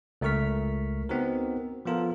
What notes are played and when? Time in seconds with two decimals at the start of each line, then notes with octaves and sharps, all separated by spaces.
0.21 C#2 A3 A#4 C#6 F6 B6
1.09 B3 C4 D#4 F#4 A#4
1.85 F3 B3 F4 A4 A#4